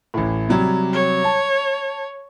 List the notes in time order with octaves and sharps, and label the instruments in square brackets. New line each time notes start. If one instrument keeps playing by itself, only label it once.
[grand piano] A1 A2
C3 F#3 G3
[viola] C#5
[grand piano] A5